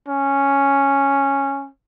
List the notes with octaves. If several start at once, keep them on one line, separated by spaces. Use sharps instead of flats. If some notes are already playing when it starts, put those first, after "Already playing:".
C#4